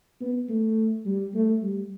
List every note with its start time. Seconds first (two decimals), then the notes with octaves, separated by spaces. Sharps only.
0.21 B3
0.49 A3
1.05 G3
1.34 A3
1.62 G3